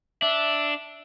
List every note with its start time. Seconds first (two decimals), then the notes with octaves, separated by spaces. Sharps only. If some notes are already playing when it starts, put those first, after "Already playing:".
0.22 D4 E5